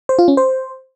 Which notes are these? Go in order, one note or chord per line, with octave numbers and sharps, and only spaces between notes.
C5
F4
C#4
C5